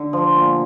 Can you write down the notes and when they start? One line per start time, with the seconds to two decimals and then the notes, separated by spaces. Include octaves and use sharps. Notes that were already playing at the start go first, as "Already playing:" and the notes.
Already playing: D3
0.13 F3
0.36 A#2